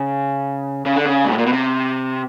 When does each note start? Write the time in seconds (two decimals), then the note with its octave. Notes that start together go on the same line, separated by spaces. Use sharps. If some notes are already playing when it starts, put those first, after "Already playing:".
Already playing: C#3
0.86 C#3
0.96 D3
1.06 C#3
1.25 G#2
1.31 A2
1.38 A#2
1.46 B2
1.53 C3